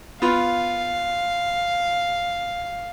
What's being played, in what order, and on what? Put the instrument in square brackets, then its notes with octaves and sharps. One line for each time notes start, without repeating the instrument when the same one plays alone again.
[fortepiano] B3 F4 [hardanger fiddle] F5